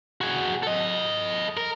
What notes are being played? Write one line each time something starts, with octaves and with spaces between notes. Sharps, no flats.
F#4 G#4
A4 D#5
A#4